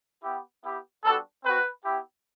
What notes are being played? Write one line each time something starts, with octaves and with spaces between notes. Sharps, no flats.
B3 E4 G4
B3 E4 G4
G3 B3 D4 F#4 A4
C4 F#4 B4
B3 E4 G4